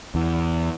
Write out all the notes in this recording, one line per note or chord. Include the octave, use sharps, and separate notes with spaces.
E2